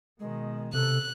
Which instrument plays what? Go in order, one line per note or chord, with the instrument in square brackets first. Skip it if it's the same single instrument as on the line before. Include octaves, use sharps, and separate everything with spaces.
[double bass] B2 D#3 [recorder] G#3
[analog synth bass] C3 [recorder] A4 [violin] F#6